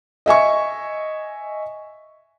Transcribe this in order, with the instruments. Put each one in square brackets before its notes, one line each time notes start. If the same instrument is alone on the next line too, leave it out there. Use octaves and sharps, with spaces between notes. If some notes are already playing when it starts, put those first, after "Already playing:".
[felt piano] D#5 E5 G#5 C#6